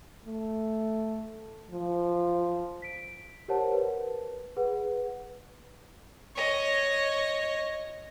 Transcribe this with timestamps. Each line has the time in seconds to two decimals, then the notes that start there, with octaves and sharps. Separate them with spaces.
0.25 A3
1.71 F3
2.82 B6 D7
3.48 G4 A#4 C5 C#5 F#5 A5
3.72 A#4 B4
4.57 G#4 B4 F#5
6.36 C#5 D#5